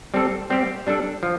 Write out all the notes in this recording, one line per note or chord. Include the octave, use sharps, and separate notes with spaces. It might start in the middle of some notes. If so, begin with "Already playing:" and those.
G3 C4 A4
G3 C4 G4
G3 D4 A4
F3